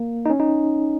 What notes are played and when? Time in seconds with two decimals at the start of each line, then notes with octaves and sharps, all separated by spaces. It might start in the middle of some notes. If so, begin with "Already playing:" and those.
Already playing: A#3
0.26 D#4
0.30 C#4
0.40 D#4